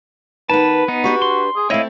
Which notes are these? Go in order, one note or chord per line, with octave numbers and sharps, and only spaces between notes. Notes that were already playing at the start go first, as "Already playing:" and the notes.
D#3 B3 B4 A5
B3 D#4
D4 F#4 G4 B4
C6
G#4
A3 C4 E4 C#5 D#5 F5